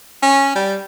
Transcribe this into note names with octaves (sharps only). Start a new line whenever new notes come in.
C#4
G3